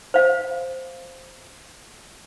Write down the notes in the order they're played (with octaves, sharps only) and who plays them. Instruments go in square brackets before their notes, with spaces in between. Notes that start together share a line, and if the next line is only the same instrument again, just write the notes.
[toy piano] C5 F5